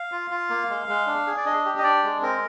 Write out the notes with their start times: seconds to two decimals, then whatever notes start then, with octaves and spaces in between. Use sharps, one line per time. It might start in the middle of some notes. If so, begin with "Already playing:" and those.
Already playing: F5
0.12 F4
0.31 F4
0.50 A#3
0.70 G#3
0.89 G#3
1.07 D4
1.27 G#4
1.37 D5
1.45 D4 D#5
1.65 G4
1.78 D#5
1.83 D4 D5
2.04 G#3
2.22 C4 A#4